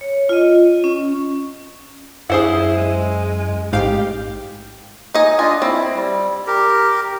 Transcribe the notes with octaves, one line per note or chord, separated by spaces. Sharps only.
C#5
F4 D#5
C#4
F#2 E4 G#4 C5 F#5
G#3
A1 G#2 G4 F5
D#4 D#5 G#5
D4 F4 D#5 G#5
C4 E4
G3
G4 A#4